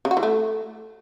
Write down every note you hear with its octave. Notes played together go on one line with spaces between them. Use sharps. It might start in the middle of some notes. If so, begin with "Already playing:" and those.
C#3
F#4
E3
A3